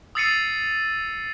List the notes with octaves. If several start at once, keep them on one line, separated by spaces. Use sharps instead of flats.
D#6 E6 A6 C7 C#7 D#7